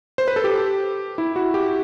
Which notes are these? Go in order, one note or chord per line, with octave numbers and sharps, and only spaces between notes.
C5
B4
A4
G4
E4
F#4
G4